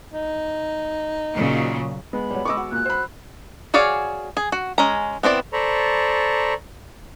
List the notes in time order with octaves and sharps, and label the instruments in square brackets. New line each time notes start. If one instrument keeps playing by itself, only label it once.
[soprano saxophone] D#4
[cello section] A#2 C#3 F#3
[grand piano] G#3 B3 [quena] B5
[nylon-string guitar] F#3 G3
[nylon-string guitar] D5 D#5 [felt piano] C#6 D6 E6
[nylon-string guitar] F#4
[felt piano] A#2 [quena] F#6
[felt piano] C5 B5
[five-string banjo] F#4 G#4 C#5 D5 F5
G#4
F#4
G#3 C#4 A#5
B3 C4 E4 D5
[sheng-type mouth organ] A4 C5 D5 A#5 B5 C#6